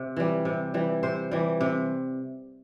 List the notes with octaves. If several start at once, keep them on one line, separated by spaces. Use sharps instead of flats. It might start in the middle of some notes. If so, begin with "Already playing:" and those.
Already playing: C3
E3 G3
C3
E3 G3
C3 C5
E3 G3
C3